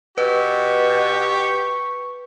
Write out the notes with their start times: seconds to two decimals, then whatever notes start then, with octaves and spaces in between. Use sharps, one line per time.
0.18 B2 G4 B4 C#6